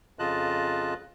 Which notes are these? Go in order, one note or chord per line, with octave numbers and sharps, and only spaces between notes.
F2 C#3 F4 D#5 A5 F#6